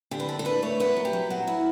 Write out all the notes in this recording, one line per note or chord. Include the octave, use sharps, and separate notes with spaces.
D3 G4
B4
D4 A4
A4
D4 B4
A3 C#5
B3 B4
F#3
G4
F#3
F#3 F#4
E4